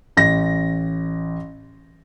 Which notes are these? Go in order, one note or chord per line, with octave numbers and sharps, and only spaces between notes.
A1 A#6